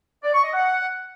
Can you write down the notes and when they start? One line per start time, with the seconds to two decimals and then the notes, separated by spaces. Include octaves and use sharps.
0.24 D5
0.34 C#6
0.44 D#5
0.53 F#5